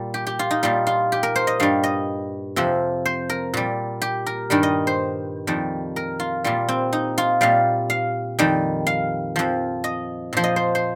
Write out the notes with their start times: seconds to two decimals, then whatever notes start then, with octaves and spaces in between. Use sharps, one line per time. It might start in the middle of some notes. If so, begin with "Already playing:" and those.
Already playing: A#2 G3
0.14 G4
0.27 G4
0.39 F4
0.51 D#4
0.63 A#2 G3 F4
0.87 F4
1.12 G4
1.23 A#4
1.36 C5
1.47 D#5
1.60 G2 G3 F5
1.84 D#5
2.56 F2 C3 F3
3.06 C5
3.30 A#4
3.54 A#2 G3
4.02 G4
4.26 A#4
4.50 G2 D#3 G3 A#4
4.63 D#5
4.87 C5
5.47 F2 D#3 G3
5.96 A#4
6.20 F4
6.44 A#2 G3 F4
6.69 C4
6.93 D#4
7.18 F4
7.41 A#2 G3 F5
7.90 F5
8.39 F2 D#3 G3
8.87 F5
9.36 F2 F3
9.84 D#5
10.33 A#2 F3 C5
10.44 D#5
10.56 C5
10.75 C5